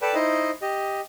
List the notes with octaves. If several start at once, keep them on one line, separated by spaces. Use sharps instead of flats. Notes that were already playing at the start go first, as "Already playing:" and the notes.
A4 B4 D5 G5 A5
D#4 E4 C5 D#5
G4 D#5